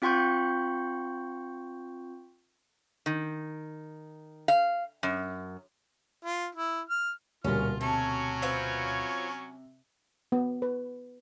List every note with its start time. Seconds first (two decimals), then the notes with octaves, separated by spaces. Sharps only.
0.02 C4 F4 G5 C6 C#6 G6
3.06 D#3
4.48 F5
5.03 F#2
6.23 F4
6.55 E4
6.90 F6
7.44 D#1 D2 B2 G3 C#4 F4 A#4 F6
7.81 C3 F#3 C#4 A4 C#5
8.42 C4 F4 B4
10.32 B3
10.62 B4